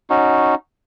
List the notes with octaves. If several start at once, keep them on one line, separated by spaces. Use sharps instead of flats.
C#4 D#4 F#4